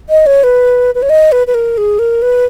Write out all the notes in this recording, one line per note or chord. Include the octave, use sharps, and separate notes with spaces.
D#5
C#5
B4
B4
C#5
D#5
B4
B4
A#4
G#4
A#4
B4